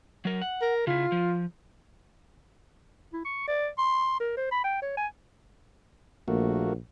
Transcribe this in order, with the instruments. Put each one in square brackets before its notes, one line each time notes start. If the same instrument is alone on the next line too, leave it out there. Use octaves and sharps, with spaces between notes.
[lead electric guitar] F#3 A#4
F#5
[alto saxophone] A#4
[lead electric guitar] C#3 E4 [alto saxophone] F4
[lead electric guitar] F3
[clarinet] E4
C#6
D5
C6
A#4
C5
B5
G5
C#5
G#5
[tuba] A#1 [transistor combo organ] A3 A#3 F#4